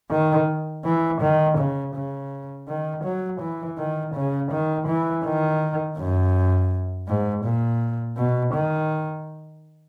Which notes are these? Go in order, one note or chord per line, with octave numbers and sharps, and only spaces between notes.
D#3
E3
D#3
C#3
C#3
D#3
F#3
E3
D#3
C#3
D#3
E3
D#3
F#2
G#2
A#2
B2
D#3